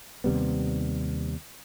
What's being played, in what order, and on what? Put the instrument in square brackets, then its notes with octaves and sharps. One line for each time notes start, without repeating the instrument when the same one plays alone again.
[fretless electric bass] D#2 C3 G3 B3